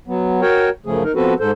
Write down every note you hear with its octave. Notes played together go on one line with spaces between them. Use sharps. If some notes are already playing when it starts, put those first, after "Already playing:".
F#3 B3
F#4 A#4 C#5 G5
F#2 C#3 F3 A3 G#4
D#4 A#4
F3 B3 C4 F#4 A4 B4
G#2 A4 C5